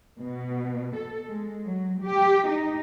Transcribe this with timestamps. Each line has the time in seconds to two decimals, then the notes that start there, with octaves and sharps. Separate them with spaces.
0.21 B2
0.96 A4
1.29 G#3
1.65 F#3
2.02 G4
2.48 D#4